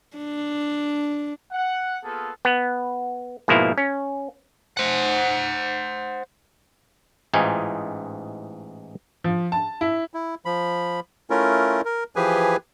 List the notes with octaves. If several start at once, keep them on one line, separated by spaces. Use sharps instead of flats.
D4
F#5
A#3 B3 F4 G#4 A4
B3
G#2 B2 F3 A#3 E4
C#4
C5 F#5
A1 G#2 E3 D#4 F4 G#5
F3
A5
E4
E4
F3 B5
A3 C#4 E4 F4 A#4
A#4
E3 F3 G4 G#4 B4 G#5